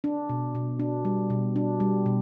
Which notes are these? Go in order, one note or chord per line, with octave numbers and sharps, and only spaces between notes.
D4
B2
B2
D4
G3
B2
D4
G3
B2